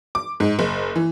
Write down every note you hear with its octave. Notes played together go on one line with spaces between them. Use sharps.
D6
G#2
F#1
E3